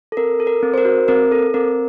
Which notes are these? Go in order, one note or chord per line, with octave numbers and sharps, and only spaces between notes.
A4
C4 A#4
A4
A#4
C4
C5
A#4
F#4
C4 A#4
A4
C4 A#4